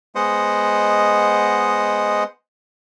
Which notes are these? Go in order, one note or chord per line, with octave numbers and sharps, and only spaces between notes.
G#3 B3 C5 D#5 F#5